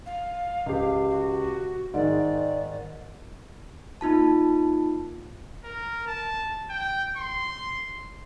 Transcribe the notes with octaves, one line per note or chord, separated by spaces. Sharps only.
F5
C#2 G4
F#4
G#2 D#3 G#3 D5
A#3 D#4 F4 A5
A#4
A5
G5
C6